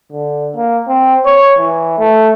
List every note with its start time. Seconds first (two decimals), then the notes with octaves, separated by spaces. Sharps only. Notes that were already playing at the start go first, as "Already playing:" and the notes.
0.12 D3
0.56 A#3
0.88 C4
1.25 C#5
1.59 E3
1.99 A3